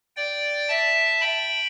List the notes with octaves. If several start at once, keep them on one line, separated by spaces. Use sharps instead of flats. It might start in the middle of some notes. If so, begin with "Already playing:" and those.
D5 G5
E5 A5
G5 B5